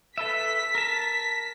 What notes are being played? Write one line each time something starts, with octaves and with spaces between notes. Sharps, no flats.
A4 B4 E5 B6
A#4 A5